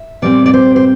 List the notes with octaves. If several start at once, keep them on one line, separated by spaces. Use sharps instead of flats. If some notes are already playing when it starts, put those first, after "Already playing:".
Already playing: E5
A#2 G3 C4 D5
D5
C5
C5